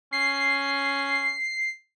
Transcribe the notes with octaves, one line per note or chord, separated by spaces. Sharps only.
C#4 C7